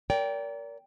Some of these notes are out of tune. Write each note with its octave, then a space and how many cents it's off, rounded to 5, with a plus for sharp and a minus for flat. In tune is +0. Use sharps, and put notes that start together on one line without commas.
A#4 +0 D5 -35 G5 +0